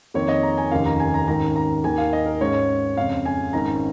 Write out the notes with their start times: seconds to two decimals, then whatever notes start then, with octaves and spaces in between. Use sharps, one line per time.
0.14 F2 D#3 A#3 C#5
0.28 D#5
0.43 A#5
0.58 G#5
0.71 F1 D#2 D#3 A#3 C#4 F5
0.86 A#5
1.00 G#5
1.14 A#5
1.27 G#2 D#3 C#4 A#5
1.56 A#5
1.84 D#2 D#3 A#3 G#5
1.98 F5
2.13 D#5
2.26 A#4
2.41 G#2 G#3 C#4 C#5
2.96 F2 C#3 G#3 C#4 F5
3.25 G#5
3.53 G#1 G#2 D#3 C#4 A#5